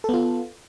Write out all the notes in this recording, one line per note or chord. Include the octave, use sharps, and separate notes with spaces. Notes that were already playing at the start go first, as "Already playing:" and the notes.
B3 F4 A4